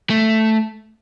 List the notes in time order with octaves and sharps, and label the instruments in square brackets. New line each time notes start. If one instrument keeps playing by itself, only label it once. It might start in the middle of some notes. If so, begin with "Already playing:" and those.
[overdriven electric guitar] A3